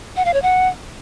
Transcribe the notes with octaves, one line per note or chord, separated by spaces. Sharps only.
F#5
F5
C#5
F#5